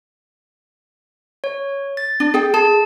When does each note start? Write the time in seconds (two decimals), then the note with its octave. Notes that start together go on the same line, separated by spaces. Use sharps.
1.44 C#5
1.97 A6
2.20 D4
2.34 G#4 G5
2.54 G#4 A5